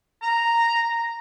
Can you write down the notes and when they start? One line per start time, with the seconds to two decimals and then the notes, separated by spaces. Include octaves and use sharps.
0.22 A#5